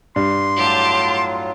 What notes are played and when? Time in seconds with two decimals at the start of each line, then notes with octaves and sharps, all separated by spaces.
0.16 G2 C6
0.58 A2 F#3 F4 G4 A5